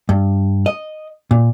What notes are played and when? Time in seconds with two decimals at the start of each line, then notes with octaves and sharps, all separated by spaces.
0.09 G2
0.66 D#5
1.31 A#2